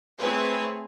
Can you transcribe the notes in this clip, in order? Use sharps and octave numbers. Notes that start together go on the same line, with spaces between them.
A3 C4 E4 G#4 B4 C#5